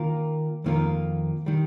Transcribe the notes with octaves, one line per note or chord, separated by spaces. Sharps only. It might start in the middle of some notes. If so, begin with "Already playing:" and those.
Already playing: D#3 A#3 F4 A#4
F2 D#3 A#3 F4 A#4
D#3 G3